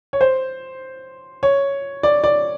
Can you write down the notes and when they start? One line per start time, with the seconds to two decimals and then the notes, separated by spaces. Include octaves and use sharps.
0.13 C#5
0.21 C5
1.43 C#5
2.03 D5
2.24 D5